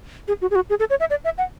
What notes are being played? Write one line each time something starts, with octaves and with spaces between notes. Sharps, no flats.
G#4
F#4
G#4
F#4
G#4
A4
C#5
E5
D5
E5
F#5